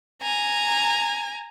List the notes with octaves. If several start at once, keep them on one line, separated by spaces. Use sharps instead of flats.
G#5 A#5